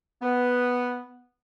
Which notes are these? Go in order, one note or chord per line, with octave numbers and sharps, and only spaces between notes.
B3